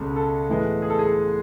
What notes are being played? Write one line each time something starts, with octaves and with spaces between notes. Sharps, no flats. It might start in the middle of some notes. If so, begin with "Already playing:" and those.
Already playing: C#2 B2 G#3 C#4 A4
A4
A2 E3 G#3 B3
G#4
A4
G#4
A4